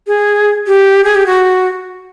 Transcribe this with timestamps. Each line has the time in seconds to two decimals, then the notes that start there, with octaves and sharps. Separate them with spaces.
0.07 G#4
0.67 G4
1.04 G#4
1.15 G4
1.27 F#4